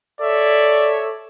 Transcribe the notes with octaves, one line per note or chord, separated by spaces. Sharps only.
A4 C#5 D5 E5